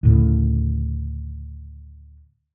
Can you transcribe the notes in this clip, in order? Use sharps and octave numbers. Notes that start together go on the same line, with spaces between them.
D2 A2 C#3